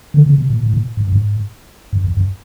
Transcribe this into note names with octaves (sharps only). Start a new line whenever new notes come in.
D3
C#3
C3
A#2
A2
A#2
G#2
G2
G#2
G2
F2
F#2